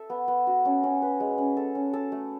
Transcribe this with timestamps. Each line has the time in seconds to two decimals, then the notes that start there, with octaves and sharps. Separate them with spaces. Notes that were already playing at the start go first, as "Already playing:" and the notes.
Already playing: A4 E5
0.10 B3
0.28 B3
0.47 F#4
0.65 C#4
0.83 C#4
1.02 B4
1.20 G#3
1.38 C#4
1.57 A4
1.75 C#4
1.93 A4
2.12 A3